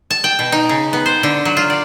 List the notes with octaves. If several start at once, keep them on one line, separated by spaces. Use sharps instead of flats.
A5
G5
B2
D#4
C#3
B3
C5
D3
F#3
F4
D5